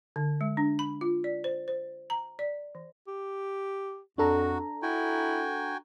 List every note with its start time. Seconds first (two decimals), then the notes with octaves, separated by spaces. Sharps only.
0.16 D3
0.41 G#3
0.57 D4
0.79 B5
1.01 F4
1.24 D5
1.44 C5
1.68 C5
2.10 A#5
2.39 D5
2.75 E3
3.07 G4
4.18 F2 D4 F#4 A4 A#5
4.82 E4 F#4 G5 G#5